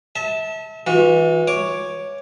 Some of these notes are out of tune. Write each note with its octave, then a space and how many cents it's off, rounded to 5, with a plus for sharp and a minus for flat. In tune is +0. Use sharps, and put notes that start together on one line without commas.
E5 -35 A5 +0
E3 -15 F#4 -45
C#5 +0 D6 +0